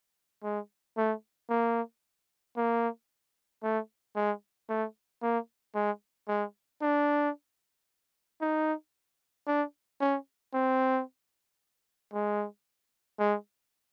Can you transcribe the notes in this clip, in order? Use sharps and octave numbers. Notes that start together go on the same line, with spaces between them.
G#3
A3
A#3
A#3
A3
G#3
A3
A#3
G#3
G#3
D4
D#4
D4
C#4
C4
G#3
G#3